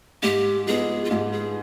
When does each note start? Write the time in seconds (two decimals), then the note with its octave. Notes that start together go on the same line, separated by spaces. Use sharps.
0.23 G#2 G4
0.67 F3 G#3 B3 D#4 G#4
1.05 F4
1.10 G#2 G4
1.32 G#4